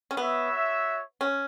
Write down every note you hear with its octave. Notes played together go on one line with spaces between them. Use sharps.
C#4
B3 F#4 C#5 E5
C#4